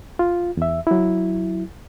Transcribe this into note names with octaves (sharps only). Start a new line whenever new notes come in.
F4
E2 E5
F#3 E4